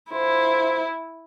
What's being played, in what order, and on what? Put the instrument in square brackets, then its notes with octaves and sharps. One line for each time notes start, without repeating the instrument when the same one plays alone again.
[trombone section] D3 F4 C5 [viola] E4